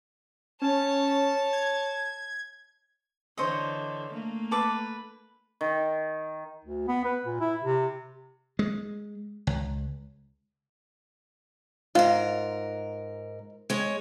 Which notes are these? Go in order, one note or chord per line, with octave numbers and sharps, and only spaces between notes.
C#4 C#5 A5
G#6
D3 E3 C5 C#5 D#5
A3 A#3
A4 B4 D6
D#3
D2
B3
B4
A#2
E4
C3
G#3
C#2
G#2 F4 A#4
G#3 C#5